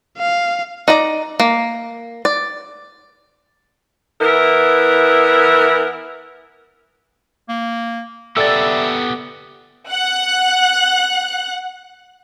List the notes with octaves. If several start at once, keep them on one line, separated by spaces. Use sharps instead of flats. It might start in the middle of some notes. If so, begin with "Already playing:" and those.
F5
D#4 D5 A#5
A#3
D5
E3 B3 E4 A#4
A#3
B3 G4 A4 D5 E5 E6 A6
F#5 F#6